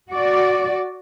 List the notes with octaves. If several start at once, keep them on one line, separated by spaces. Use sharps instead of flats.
F#4 D5